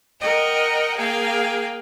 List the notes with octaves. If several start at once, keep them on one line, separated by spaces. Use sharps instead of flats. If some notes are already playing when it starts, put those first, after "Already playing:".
A#4 D#5 F#5 G5
A#3 G#4 F5 G5